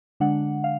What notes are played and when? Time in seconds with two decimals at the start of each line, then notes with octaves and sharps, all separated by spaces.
0.20 D3 G#3 D4 F#5
0.64 F5